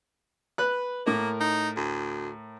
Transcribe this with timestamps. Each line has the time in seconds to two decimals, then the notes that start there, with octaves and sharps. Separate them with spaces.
0.58 B4 F#6
1.06 A2 A#3 A#4
1.41 D#4
1.77 D2